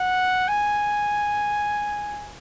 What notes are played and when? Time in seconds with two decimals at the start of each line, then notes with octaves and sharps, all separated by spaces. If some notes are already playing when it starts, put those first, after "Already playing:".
Already playing: F#5
0.48 G#5